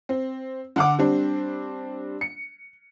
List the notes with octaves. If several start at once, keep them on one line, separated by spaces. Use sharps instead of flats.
C4
D3 F#5 D6
G3 C4 D4
C#7